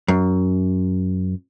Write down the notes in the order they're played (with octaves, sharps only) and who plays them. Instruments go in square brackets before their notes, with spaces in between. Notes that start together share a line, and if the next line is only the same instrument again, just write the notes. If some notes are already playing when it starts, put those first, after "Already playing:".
[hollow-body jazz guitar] F#2